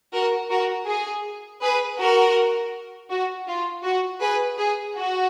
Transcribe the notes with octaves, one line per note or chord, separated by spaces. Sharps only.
F#4 A#4
F#4 A#4
G#4
G#4 B4
F#4 A#4
F#4
F4
F#4
G#4 B4
G#4
F#4